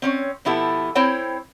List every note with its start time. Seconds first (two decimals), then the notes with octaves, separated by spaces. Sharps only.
0.02 C4 C#4 C#5
0.45 B2 F3 B3 E4 G4 A4
0.95 C4 E4 C5 C#5 G5